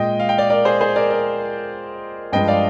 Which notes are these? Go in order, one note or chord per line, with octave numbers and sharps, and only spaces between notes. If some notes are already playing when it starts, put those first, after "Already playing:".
Already playing: A#2 G#3 D#5 G5
F5
G5
D5 F5
A#4 D5
G#4 C5
G#4 C5
A#4 D5
A#4 D5
G2 F3 G#3 D#5 G5
D5 F5